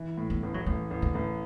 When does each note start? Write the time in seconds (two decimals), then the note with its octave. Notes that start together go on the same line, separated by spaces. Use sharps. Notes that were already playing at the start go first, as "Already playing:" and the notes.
Already playing: E3
0.17 A2
0.30 B3
0.43 A1
0.54 F#3
0.66 A1 A3
0.91 A1
1.02 D3
1.15 A1